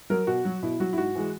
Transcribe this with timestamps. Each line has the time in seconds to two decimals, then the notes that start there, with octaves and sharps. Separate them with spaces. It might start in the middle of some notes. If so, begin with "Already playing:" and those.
0.10 F#3 A#4
0.27 B2 F#4
0.45 F#3
0.62 B2 E4
0.80 F#3 F#4
0.93 E4
0.98 G#2 F#4
1.15 E3 G#3